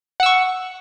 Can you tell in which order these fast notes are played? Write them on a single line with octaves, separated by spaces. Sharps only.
F#5 E6 C#6